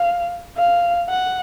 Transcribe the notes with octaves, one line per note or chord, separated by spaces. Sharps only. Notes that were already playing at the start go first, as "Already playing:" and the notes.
Already playing: F5
F5
F#5